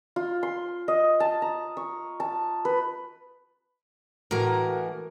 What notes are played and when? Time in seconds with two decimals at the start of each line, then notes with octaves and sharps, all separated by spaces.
0.16 F4
0.43 C6
0.88 D#5
1.20 A5
1.42 A#5
1.77 C#6
2.20 A5
2.65 B4
4.31 A2 E3 F#4 A#4